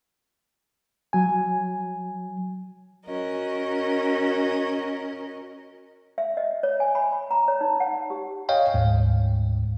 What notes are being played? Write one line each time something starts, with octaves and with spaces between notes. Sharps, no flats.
F#3 G#5
C#4 F#4 A#4 D#5
E5
D#5
C#5
G#5
B5
B5
A#5
C#5
D#4
F#5
G4
C#5 D#5 F5 G5 G#5
D2 G#2